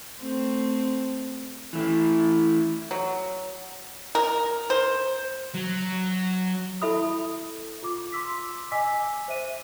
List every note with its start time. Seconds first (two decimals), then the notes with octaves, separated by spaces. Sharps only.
0.20 A3 C4
1.73 E3 A3 E4
2.91 F#3
4.15 A#4
4.70 C5
5.54 F#3
6.82 E4 A4 E5 B5 D#6
7.83 F4 D6
8.12 C6 D6 E6 B6
8.72 D#5 G#5 D6 E6 B6
9.28 C5 E5 D#7